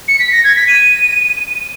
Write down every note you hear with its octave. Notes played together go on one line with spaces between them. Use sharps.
C#7
B6
A#6
G#6
B6
D#7